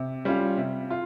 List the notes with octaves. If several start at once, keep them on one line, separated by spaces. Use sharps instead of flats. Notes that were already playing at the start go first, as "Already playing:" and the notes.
Already playing: C3
G3 C#4 F4
C3
F4